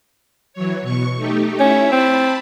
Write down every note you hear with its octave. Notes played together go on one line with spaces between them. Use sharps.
E3 F#3 C#5
B2 C#6
A3 D#4 G4
C#4 E4 C#5 E5
C4 A5 B5